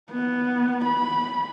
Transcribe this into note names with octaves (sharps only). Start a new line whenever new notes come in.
B3
B5